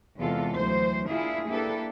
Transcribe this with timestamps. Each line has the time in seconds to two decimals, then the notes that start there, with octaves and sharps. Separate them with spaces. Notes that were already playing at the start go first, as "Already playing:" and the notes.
0.18 E2 C3 G#3 F4 A4
0.54 D2 E3 F#3 C5
1.08 A#3 D4 E4 F4 G#4
1.48 A#3 D4 E4 G4 A4 B4